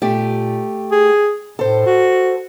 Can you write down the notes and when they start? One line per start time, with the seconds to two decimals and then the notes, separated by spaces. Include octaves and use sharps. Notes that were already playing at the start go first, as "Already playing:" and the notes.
0.02 A#2 A3 G4
0.91 G#4
1.59 A2 A4 C5
1.86 F#4